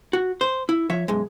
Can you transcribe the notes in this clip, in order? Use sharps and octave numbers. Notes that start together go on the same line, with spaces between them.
F#4
C5
E4
F3 C#5 E5
B1 F#2 G#3